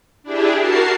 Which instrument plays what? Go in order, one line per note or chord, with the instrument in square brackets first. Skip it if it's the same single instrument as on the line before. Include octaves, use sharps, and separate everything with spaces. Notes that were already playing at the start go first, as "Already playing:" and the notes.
[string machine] D4 E4 G4 G#4
F#4 A#4 A5 C7